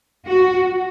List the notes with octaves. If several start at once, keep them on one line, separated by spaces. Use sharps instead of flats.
F#4